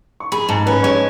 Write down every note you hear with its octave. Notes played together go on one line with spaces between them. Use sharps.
C#6
G#4 B5
G#2 A5
C#4 B4
G#3 C#5